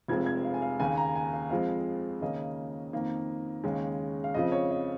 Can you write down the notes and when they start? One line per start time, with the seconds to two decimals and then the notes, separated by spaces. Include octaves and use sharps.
0.08 F1 F2 F3 G#3 G#6
0.26 G#6
0.44 F5
0.54 G#5
0.62 F5
0.80 D#2 C#3 A#3 G#5
0.97 A#5
1.16 G#5
1.33 F5
1.50 F2 F3 G#3 F5
2.21 D#2 C#3 A#3 C#4 D#5
2.93 F2 D#3 A#3
3.64 D#2 C#3 G#3 C#4
4.24 F5
4.34 F2 C#3 F3 D#5
4.52 C#5
4.71 D#5